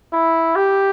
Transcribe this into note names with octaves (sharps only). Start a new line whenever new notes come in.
E4
G4